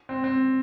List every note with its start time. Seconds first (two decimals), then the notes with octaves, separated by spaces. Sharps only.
0.09 C4
0.24 C4